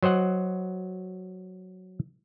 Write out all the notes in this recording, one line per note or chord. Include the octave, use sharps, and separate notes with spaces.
F#3 C5 D#5 F#5